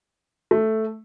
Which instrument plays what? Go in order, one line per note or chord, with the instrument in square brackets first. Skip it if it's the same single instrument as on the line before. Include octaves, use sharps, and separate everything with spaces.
[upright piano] A3